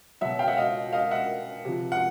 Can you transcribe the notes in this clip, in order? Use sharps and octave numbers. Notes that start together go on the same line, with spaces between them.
B2 F#3 E5 F#5
F5 G5
E5 F#5
D#5 F5
D#5 F5
E5 F#5
C3 F3
F#5